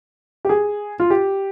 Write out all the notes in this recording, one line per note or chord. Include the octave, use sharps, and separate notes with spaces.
G4
G#4
F4
G4